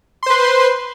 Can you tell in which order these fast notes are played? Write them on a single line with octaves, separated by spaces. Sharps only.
C6 C5 B4